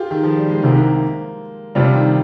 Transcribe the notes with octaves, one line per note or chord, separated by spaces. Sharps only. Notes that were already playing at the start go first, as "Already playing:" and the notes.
Already playing: F4 G4 G#4
D#3
F3
G3
G#3
C2 C3 D#3 A#3
C3 G3 D4 F4
D#3